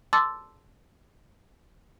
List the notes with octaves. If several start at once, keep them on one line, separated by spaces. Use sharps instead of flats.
A5 C6 D6 E6 A6